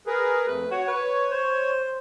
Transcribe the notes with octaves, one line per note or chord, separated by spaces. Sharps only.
G#4 A#4 B4
F2 A3 B4
F#4 C#5
B4
C5